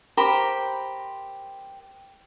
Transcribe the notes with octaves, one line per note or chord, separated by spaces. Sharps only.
G4 A#4 C5 B5